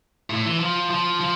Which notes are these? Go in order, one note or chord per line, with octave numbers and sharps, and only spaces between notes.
A2
E3
F3
F3
F3